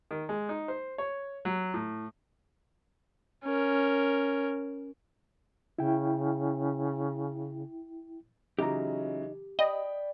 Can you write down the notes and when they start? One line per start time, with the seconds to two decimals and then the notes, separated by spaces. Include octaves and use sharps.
0.11 D#3
0.29 G#3
0.49 D#4
0.68 C5
0.98 C#5
1.45 F#3
1.74 A2
3.44 C#4 A#4
5.79 C#3 E4 G5
8.59 C#3 E3 F#3 D#4 G4 A#5
9.59 D5 D#5 G5 B5